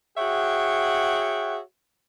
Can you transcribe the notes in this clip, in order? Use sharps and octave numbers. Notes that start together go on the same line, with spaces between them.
F#4 G#4 C#5 E5 F#5 G5